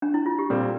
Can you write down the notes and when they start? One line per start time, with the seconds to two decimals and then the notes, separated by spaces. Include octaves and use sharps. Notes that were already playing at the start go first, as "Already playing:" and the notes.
0.02 D4
0.14 E4
0.26 F4
0.39 G4
0.50 A#2 G3 C4 A4